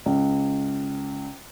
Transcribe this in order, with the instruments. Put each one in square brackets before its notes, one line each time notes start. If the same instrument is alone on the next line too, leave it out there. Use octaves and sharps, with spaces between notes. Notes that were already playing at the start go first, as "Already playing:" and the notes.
[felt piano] C#2